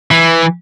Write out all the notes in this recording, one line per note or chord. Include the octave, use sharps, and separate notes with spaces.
E3